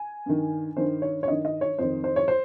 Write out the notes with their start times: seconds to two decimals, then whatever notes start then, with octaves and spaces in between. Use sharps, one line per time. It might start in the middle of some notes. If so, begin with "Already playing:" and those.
Already playing: G#5
0.26 G2 D#3
0.77 G2 D#3 C5
1.02 C#5
1.23 C#5
1.27 G2 D#3 D#5
1.45 D#5
1.61 C#5
1.78 F2 D#3 C5
2.04 C5
2.16 C#5
2.28 C5